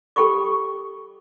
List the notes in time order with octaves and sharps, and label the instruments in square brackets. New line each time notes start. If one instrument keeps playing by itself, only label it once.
[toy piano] G4 A4 G5 B5 C#6 D6